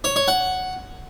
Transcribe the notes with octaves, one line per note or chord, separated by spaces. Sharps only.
C#5
C#5
F#5